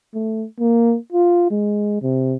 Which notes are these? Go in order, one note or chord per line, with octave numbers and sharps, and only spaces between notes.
A3
A#3
F4
G#3
C3